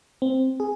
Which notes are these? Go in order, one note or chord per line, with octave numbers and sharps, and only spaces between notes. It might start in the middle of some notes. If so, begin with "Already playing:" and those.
C4
G#4